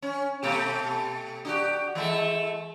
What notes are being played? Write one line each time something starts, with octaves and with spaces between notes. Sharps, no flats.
C#4
B2 A3 G4
D4 F#4 G4
E3 G#3 A3